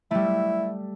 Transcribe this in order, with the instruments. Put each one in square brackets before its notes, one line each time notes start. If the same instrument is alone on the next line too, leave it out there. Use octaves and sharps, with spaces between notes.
[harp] G3 A3 [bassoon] E4